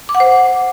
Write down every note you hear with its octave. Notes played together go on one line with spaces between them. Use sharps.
D6
F#5
C5